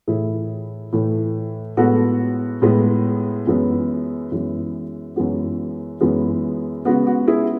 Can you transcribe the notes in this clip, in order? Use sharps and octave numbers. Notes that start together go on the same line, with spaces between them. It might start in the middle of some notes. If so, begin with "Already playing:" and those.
A2 E3 A3 E4 G#4
A2 E3 A3
A2 G#3 B3 F#4 A4
A2 G#3 B3
F#2 E3 G#3 B3
F#2 E3 G#3 B3
F#2 E3 G#3 B3 F#4
F#2 E3 G#3 B3
C#3 G#3 B3 F#4
F#4
E4 G#4